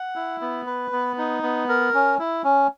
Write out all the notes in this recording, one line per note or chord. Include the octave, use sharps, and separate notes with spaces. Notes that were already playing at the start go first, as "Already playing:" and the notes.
Already playing: F#5
E4
B3
B4
B3
D#4
B3
A#4
C#4
E4
C#4